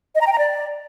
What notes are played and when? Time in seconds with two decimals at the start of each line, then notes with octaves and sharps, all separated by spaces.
0.15 D#5
0.21 A#5
0.27 G5
0.33 A#5
0.38 D5